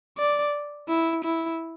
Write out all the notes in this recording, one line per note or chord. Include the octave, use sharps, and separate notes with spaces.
D5
E4
E4